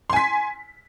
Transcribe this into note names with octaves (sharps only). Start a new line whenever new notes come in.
G#5 C6 B6